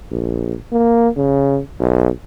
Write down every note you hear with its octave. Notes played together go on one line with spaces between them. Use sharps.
A#1
A#3
C#3
B1